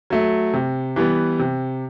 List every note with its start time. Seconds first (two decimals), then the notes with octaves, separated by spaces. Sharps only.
0.10 F#3 A3
0.53 C3
0.96 E3 G3 B3
1.39 C3